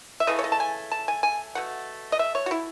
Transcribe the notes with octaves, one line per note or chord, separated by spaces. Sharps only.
E5
C#3 E3 A3 D#5
C#5
D#5
A5
G#5
A5
G#5
G#5
B2 A3 F#5
D#5
E5
C#5
F#4
E4